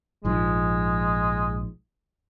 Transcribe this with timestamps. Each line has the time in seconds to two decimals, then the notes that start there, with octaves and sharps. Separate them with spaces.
0.25 A#1 G#2 F3 G#3